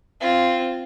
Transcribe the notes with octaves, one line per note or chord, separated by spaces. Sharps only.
C4 F4